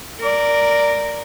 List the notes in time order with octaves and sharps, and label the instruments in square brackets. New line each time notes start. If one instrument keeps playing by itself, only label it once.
[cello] A#4 D5